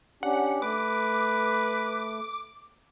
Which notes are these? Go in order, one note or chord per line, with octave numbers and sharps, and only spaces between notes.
C#4 D4 G4 F#5
A3 B4 D6